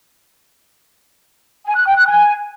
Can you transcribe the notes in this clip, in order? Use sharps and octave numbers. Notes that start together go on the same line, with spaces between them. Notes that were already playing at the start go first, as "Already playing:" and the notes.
G#5
F#6
G5
F#6
G#5